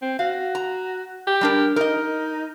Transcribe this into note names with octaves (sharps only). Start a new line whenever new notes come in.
C4
F#4 F5
A#5
G4
G3 D4 A#4
D#4 A#4 D#5